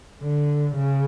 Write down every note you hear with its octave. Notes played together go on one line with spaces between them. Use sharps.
D3
C#3